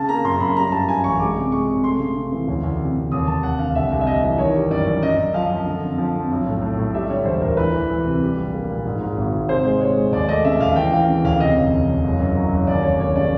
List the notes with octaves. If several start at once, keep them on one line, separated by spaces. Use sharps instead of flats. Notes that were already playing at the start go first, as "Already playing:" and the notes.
Already playing: C#3 A5
A#3 A#5
F#2 C6
F#2 B5
G3 A#5
G2 A5
G2 G#5
A1 C#6
G#3 D6
C3
G#3 C#6
C3
A3 C6
C#3
C#3
E3
D2
D2
C3
C3
D#2 D#6
D#2 A5
F1 F#5
D3 F5
C2 E5
C2
E5
C3 D#5
E3
D#3 C#5
G3
F#2 D5
F#2
F#2 D#5
F#2
F3 F5
F3
D3
F2
F3
F2
B1
A2
A2
A2
G3 E5
D3 C#5
E1 C5
D2 A#4
E3 B4
E3
E3
C3
G3
A#1
A#3
A#2
G#2
G#2
G#1
G#2
C3 C5
G#3
G#3 C#5
G#3
D#2 D5
A3 D#5
C#3 E5
D#2 F5
E3 G5
E3 F5
C#3
D2 F5
C3 D#5
E1
D2
E1
F#1
F#2
F#3
F#1
D#2 D5
F1 C#5
D#2 C#5
C#3 D5